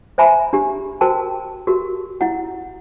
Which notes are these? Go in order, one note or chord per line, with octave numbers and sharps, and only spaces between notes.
C5 E5 G#5 A#5 B5
D4 G4
F#4 A#4 C5 G5 A5
F#4 G4 A#4
E4 F#5